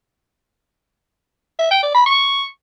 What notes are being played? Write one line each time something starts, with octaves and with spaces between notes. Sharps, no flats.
E5
G5
D5
B5
C#6